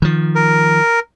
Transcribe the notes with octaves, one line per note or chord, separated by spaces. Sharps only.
D#3 F3
A#4